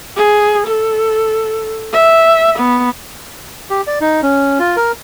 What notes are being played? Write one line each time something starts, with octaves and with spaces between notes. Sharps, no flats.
G#4
A4
E5
B3
G4
D5
D#4
C#4
F4
A#4